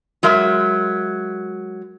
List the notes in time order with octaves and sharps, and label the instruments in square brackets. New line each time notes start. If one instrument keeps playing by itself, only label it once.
[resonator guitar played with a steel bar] F#3 G#3 A#4 E5